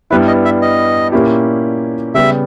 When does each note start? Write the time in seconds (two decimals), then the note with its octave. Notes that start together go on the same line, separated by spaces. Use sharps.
0.11 G2 G3 B3 E4 B4
0.27 D#5
0.45 E5
0.62 D#5
1.12 A#2 A#3 C#4 E4 G4
2.15 C#3 G3 B3 G4 E5